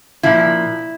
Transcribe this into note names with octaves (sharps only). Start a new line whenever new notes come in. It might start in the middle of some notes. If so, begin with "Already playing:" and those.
A#2 F3 E4